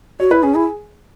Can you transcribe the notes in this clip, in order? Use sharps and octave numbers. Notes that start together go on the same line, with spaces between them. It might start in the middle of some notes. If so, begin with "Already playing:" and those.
F#4 C#5
E4 B4
C#4 G#4
E4 G#4